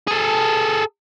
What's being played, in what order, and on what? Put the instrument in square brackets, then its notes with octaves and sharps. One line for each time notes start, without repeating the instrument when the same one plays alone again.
[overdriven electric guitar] G#4 A4